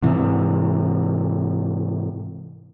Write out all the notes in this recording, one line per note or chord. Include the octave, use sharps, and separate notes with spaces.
G#2 C3 E3